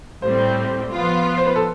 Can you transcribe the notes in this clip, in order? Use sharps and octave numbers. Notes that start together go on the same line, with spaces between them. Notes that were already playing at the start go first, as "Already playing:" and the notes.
A2 G3 C4 C5
F3 B3 F4
C5
B4
A4